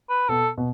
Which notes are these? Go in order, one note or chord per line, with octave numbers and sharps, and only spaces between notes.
B4
B2 B3 A4
B2 B3